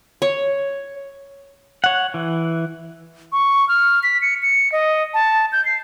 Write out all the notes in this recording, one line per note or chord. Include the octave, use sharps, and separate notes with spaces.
C#5
C#5 F#5
E3
C#6
F6
B6
C#7
C#7
D#5
A5
G6
C7